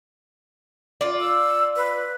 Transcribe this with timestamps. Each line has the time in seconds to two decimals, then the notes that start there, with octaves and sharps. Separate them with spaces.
1.01 F4 D5
1.20 E6
1.76 B4